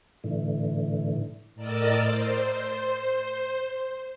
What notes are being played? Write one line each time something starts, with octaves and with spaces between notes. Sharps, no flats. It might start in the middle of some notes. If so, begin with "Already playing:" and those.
A2 D3 E3
A2 A#4 D5 D#5 E6 A6
C5